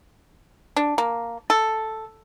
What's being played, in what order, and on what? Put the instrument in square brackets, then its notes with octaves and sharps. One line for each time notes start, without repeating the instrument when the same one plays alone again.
[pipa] D4
A#3
A4